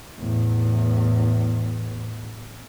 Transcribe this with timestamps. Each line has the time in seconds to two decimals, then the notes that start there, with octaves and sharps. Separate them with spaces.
0.19 E2 A2